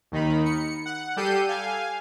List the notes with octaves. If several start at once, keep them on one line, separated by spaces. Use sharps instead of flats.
D#2 D#3 D#4 B5
C#7
F#5
G3 G4 A4 G6 C7 D#7
F5 G#5